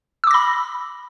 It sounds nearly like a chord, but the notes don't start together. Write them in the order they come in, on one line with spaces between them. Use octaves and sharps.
E6 D6 A#6 B5